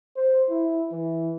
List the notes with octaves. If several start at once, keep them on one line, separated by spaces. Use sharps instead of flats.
C5
E4
E3